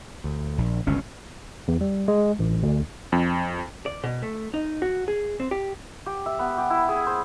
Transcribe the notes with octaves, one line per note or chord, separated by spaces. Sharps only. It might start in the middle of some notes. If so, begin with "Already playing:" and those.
D2
A#1
G1 C#2 C3 C#4
E2
G3
G#3
A1
D2
F2
D5
B2
A3
D#4
F#4
G#4
C4
G4
G4
E5
B3
G4
E4
G#4
C5